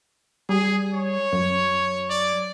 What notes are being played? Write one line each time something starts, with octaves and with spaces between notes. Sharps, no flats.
G3 G#4
C#5
F#2
D5